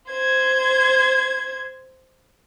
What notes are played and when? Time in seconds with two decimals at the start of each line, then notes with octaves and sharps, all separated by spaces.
0.10 C5 G#6